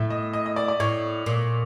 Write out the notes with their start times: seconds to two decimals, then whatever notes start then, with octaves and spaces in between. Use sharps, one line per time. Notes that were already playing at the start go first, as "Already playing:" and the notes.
Already playing: A2 E5
0.10 D#5
0.33 D#5
0.46 D#5
0.56 D5
0.68 D5
0.80 A2 C#5
1.26 A#2